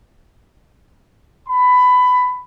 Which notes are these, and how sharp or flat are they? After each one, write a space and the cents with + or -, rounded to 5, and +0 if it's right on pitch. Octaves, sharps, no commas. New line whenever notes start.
B5 +15